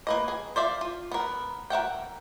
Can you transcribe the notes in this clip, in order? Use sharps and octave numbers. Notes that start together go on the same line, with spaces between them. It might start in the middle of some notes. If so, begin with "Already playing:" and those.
A#3 B4 D#5
G#4
C5 D5 E5 F5
F4
B3 A#4
A#4 E5 F#5 G5